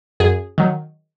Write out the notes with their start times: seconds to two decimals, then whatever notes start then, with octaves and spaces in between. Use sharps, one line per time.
0.20 F#2 G#4
0.58 D#3 F#3